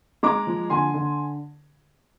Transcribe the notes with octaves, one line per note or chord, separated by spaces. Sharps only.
G#3 A#5 D6
F3
D3 G#5 C6
D3